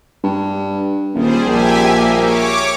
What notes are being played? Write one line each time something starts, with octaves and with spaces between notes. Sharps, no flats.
G2
D#1 G3 G#4 C5
A#1 G4 E5 G#5
A#3
C#5 D6